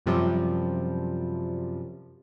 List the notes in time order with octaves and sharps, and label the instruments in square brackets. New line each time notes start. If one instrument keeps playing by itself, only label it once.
[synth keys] F#2 C3 F3 G3